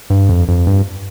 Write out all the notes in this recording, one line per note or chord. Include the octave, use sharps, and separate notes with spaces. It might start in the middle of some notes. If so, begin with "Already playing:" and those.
G2
F2
F2
G2